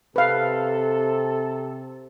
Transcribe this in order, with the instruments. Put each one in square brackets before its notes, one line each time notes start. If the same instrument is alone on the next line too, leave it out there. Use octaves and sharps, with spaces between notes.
[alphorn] C3 [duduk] A4 [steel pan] B4 F5